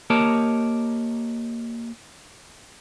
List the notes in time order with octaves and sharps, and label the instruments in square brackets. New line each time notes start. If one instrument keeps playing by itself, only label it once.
[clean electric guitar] A#3 G4 A#4 C#5 D#5 A5